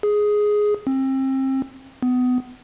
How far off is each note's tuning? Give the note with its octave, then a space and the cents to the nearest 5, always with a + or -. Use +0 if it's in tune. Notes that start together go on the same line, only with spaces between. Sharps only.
G#4 +5
C4 +30
B3 +25